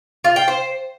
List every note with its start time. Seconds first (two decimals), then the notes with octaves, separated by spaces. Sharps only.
0.24 F4
0.36 G5
0.48 C5